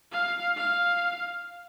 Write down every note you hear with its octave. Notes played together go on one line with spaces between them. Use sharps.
F5
F5